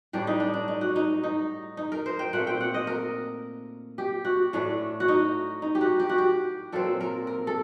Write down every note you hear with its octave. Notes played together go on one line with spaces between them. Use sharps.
A2 G3 D4 G4
D#4
D4
D4
D#4
F#4
D#4
D#4
D#4
A#4
C5
G5
A#2 A3 C4 F#5
G5
F#5
D#5
A#4
G4
F#4
A2 A3 D4
F#4
D#4
D#4
G4
F#4
G4
F#4
G4
A#2 F#3 C4 A4
A#4
A#4
A4